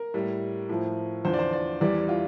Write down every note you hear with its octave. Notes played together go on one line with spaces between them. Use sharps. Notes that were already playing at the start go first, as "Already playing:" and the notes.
Already playing: A#4
A2 G3
A2 F3
E2 D3 F3 C5
D5
C5
D5
E2 E3 G3 D5
F4